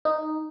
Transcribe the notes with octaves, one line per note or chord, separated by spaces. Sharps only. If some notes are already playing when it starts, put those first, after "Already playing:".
D#4